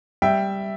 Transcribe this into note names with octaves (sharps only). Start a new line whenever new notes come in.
G3 E5 G5